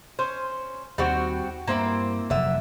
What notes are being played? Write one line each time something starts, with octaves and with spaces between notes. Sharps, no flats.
C#4 C5
D#2 G3 C4 F#4
G2 A#3 C4 E4
F1 D3 F#3 E5